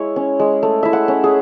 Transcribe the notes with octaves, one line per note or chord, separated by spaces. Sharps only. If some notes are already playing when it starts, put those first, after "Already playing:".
Already playing: G#3 E4 C#5
C#4
G#3
A3
E4 E5
F#5
C#4
G#4